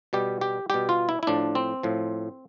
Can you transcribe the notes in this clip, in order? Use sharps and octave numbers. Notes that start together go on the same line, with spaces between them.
B2 G3 G4
G4
B2 G3 G4
F4
E4
E4
A2 F3 D4
C4
A2 F3